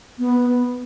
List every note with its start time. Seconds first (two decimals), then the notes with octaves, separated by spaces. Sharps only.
0.19 B3